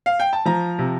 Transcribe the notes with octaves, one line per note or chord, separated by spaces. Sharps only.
F5
G5
A5
F3 A#5
C3